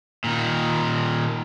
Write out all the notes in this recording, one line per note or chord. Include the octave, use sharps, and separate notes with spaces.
A#2 D#3